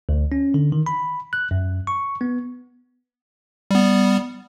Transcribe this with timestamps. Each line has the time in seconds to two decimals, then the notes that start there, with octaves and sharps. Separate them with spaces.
0.09 D2
0.32 C#4
0.54 D3
0.72 D#3
0.86 B5
1.33 F#6
1.51 F#2
1.87 C#6
2.21 B3
3.71 G3 B3